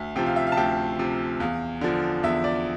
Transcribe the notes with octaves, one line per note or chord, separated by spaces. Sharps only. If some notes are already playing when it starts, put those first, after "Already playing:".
Already playing: D2 E5
C3 F3 G5
F5
E5
F5
A5
D2 G5
C3 F3
E2 F5
D3 F3
E2 E5
D5